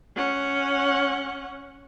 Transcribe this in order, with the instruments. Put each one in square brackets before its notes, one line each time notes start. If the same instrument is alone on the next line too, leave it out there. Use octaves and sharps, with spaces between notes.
[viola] C#4 F#5